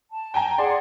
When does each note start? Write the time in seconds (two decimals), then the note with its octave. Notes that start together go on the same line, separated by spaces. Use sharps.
0.12 A5
0.34 G5 G#5 A#5
0.58 G#4 D5 F#5 C6